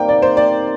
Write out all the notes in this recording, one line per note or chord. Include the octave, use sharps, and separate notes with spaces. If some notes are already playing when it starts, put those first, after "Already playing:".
Already playing: G2 C3 D#3 G3 A#3 D#4 G5
D5
C5
D5